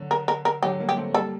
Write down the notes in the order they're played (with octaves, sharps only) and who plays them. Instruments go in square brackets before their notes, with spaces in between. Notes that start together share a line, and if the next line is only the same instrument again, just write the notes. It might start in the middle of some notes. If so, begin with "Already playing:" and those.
Already playing: [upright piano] D3 F#3
[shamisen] A#4
A#4
A#4
[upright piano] D3 F#3 [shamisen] G4
[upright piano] G3 A#3
[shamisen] G4
[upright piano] A3 C4
[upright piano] G3 A#3 [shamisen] A4